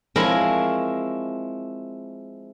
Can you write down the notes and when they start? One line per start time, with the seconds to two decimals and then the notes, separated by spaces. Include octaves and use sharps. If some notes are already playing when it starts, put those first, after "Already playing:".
0.16 F3 G#3 C4 E4 A#4 C#5